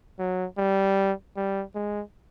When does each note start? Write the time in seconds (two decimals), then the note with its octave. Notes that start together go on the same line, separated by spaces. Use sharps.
0.19 F#3
0.58 G3
1.36 G3
1.75 G#3